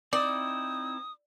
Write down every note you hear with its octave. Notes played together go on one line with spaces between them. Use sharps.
C4 D#4 E4 D5 D#6